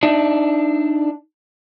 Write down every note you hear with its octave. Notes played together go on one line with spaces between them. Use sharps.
D4 D#4 E5